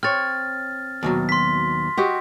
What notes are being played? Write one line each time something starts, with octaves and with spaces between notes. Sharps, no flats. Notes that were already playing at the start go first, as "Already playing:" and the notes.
C4 C#5 F6 A6
D#2 B2 F#3
C6 B6
F#4 G4 D#5